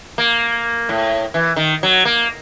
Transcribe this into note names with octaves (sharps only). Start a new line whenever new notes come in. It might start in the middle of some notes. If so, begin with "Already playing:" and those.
A#3
A2
E3
D#3
F#3
A#3